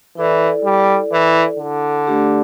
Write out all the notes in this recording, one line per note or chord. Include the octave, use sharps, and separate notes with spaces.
E3 E4 A4 D5
G3
E3
D3
A3 D4 G4 D5